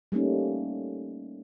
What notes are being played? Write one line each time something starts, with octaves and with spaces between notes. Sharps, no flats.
G3 A3 A#3 C#4 D#4